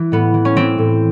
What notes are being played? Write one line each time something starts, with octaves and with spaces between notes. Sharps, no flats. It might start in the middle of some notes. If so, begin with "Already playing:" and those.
Already playing: E3
A2 B3
E3
C#4
E3 C4
A2